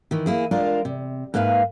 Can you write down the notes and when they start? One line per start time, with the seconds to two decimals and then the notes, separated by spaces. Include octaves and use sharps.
0.11 D#3 E3
0.26 A#3 E4 G#4
0.51 G#3 D4 F4 A#4
0.85 C3
1.34 G#2 A#3 B4 E5 F5